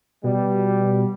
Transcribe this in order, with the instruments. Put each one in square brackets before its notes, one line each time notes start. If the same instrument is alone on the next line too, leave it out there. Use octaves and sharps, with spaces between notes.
[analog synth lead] B2 [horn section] G3